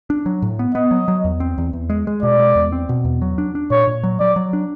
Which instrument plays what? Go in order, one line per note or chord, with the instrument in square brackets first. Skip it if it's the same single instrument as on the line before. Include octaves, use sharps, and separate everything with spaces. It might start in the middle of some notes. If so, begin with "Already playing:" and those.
[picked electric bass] D4
F#3
A2
B3
[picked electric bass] B3 [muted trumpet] D#5
[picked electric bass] F#3
F#3
E2
C4
E2
E2
G#3
G#3
[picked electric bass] B2 [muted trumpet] D5
[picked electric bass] G#3
E2
C4
B2
E2
F#3
D4
D4
[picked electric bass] A#2 [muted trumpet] C#5
[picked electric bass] A#2
F#3
[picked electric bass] F#3 [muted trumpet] D5
[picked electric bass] F#3
D4